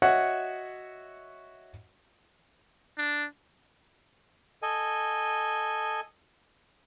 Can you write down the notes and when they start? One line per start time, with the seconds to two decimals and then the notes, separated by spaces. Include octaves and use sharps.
0.02 F#4 C#5 D#5 E5 F#5 C#6
2.98 D4
4.62 A4 D#5 G#5